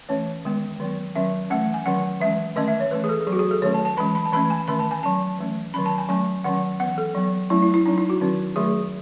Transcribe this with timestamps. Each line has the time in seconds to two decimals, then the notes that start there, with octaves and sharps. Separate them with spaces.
0.09 E3 A3 C#4 C#5
0.45 D#3 G#3 B3
0.80 D#3 F#3 B3
1.15 D#3 F#3 C#4 E5
1.50 E3 A3 C#4 F#5
1.74 G#5
1.86 D#3 F#3 C#4 F#5
2.21 E3 G#3 C#4 E5
2.56 D#3 A3 C#4 D#5
2.68 E5
2.80 C#5
2.91 E3 A3 C#4 B4
3.04 G#4
3.09 A4
3.27 F#3 G#4
3.31 B3 F#4
3.39 G#4
3.51 A4
3.62 D#3 F#3 A3 C#4 C#5
3.74 A5
3.85 A5
3.97 E3 G#3 C#4 B5
4.15 B5
4.25 A5
4.32 E3 A3 C#4 B5
4.50 G#5
4.68 D#3 A3 C#4 B5
4.79 A5
4.91 G#5
5.03 F#3 C#4 A5
5.39 E3 A3 C#4
5.74 D#3 F#3 C#4 B5
5.86 A5
5.98 G#5
6.09 F#3 A3 C#4 G#5
6.44 D#3 F#3 C#4 F#5
6.80 E3 B3 F#5
6.98 A4
7.15 F#3 B3
7.50 F#3 A3 C#4 E4
7.62 E4
7.74 E4
7.86 F#3 C#4 D#4
7.98 E4
8.10 F#4
8.21 D#3 F#3 C#4
8.56 D#3 F#3 A3 G#4